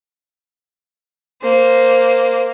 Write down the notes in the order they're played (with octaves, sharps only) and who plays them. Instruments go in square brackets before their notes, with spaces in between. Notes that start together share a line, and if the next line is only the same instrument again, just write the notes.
[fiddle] A#3 C5